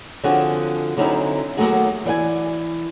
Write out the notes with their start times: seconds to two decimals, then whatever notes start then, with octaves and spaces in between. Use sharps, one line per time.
0.24 D3 F3 C4 C#4 F#4 G#4
0.97 D3 F#3 C4 C#4 D#4 E4
1.57 D#2 D#3 F#3 A3 F#4 G#4
2.05 E3 D5 G5 G#5